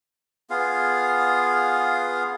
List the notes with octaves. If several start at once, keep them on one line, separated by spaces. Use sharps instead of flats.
B3 F4 G#4 F5